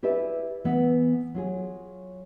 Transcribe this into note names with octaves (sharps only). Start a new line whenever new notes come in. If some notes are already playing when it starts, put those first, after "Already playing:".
E4 G4 G#4 B4 D5 E5
E3 B3
F#3 F4 G#4